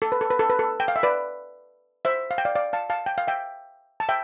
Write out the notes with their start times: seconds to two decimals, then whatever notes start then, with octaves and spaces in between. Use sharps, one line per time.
0.02 A4
0.12 B4
0.21 A4
0.30 B4
0.39 A4
0.50 B4
0.59 A4
0.80 G5
0.88 F5
0.96 E5
1.03 B4 D5
2.05 C5 E5
2.31 F5
2.38 G5
2.45 D5 F5
2.56 D5 F5
2.73 F5 A5
2.90 F5 A5
3.06 G5
3.18 F5
3.28 E5 G5
4.00 A5
4.09 E5 G5